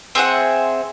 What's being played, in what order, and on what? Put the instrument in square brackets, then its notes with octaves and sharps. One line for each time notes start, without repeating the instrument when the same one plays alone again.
[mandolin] C4 G#4 E5 F#5